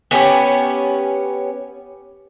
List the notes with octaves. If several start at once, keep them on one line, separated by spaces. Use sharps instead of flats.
B3 C#4 G4 C#5